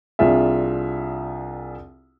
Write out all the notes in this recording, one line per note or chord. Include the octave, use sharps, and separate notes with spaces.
C2 D4 F4 G#4 E5